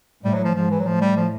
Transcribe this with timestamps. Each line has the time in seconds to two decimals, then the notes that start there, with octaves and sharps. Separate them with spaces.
0.24 A2 G3
0.34 F#3
0.44 F3
0.55 G#2 F3
0.71 E3
0.80 F#3
0.86 A2 F3
1.01 G3
1.16 F3